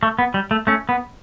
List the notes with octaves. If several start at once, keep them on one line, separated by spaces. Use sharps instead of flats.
A3
B3
G3
A3
A3 C#4
B3